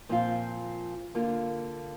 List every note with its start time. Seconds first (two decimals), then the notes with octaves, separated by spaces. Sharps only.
0.09 A#2 F3 C4 F4
1.14 D3 A#3 F4